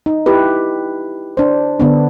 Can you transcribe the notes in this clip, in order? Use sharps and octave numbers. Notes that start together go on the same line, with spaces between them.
D#4
E4 G4 B4
D4 C5
D3 B3 D4